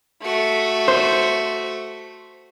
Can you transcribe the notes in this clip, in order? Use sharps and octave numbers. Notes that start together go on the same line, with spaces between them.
A3 F#4
C5